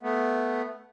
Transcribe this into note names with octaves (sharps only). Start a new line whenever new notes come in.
A3 B3